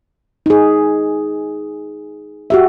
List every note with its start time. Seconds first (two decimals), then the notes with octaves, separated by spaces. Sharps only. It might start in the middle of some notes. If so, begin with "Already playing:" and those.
0.46 D#4 G#4
2.50 F#4 G4 E5